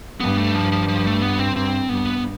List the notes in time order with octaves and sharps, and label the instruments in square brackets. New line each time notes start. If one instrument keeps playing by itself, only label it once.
[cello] G2 [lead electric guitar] B3
[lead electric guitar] A3
F3
F3
F3
A3
B3
C4
[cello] G2 [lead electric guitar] C4
[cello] G2 [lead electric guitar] B3